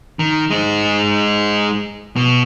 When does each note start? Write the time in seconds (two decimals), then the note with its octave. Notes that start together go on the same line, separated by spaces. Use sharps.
0.19 D#3
0.51 G#3 D#4
2.16 B2